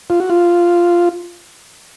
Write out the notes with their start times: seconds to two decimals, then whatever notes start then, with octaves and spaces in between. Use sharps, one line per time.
0.10 F4
0.20 F#4
0.30 F4